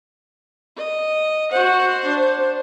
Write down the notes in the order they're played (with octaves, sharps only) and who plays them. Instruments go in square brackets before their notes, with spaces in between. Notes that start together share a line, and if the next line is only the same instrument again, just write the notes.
[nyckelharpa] D#5
[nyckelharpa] F#4 F#5 [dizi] C5
[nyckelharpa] D4